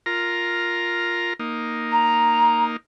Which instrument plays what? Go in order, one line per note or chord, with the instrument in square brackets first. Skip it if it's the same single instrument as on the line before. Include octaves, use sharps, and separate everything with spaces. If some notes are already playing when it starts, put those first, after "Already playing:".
[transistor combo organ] F4 A#4 A#5
A#3 D#4
[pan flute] A#5